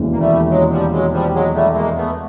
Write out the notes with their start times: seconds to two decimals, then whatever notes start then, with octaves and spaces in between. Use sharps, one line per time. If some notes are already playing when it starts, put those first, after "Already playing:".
Already playing: E1 D#2 C#3 E3
0.12 A#3
0.19 G3 A3
0.49 F#3 G#3
0.71 F3 G3
0.91 F#3 G#3
1.12 F3 G3
1.34 F#3 G#3
1.54 G3 A3
1.72 A3
1.75 G#3 A#3
1.96 A3 B3